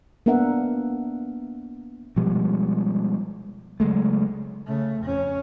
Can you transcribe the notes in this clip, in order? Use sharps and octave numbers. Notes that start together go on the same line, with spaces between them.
A#3 B3 D4 A#4 E5 F#5
B2 F3 G3 G#3
C#3 F#3 G#3 A3
C#3 A3
F2 C#4